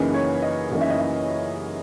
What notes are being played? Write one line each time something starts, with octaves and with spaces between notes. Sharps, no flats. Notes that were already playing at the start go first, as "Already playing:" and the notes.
Already playing: F#2 C#3 E3 A#3 D#4 B4
C#5
D#5
F#2 C#3 E3 A#3 D#4
E5
D#5
E5